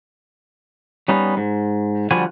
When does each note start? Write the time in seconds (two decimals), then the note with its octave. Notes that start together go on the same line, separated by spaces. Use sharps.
1.08 G3 B3 C#4 D#4
1.37 G#2
2.11 D3 F3 G3 F#4 G#5